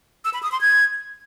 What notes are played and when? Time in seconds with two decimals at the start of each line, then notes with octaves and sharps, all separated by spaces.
0.25 E6
0.34 B5
0.43 D#6
0.52 C6
0.61 G#6